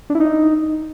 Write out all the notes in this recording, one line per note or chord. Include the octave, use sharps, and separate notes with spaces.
D4
E4
D#4